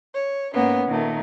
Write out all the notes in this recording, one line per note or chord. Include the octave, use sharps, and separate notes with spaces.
C#5
G#2 A#3 B3 C#4
A#2 D#3 A3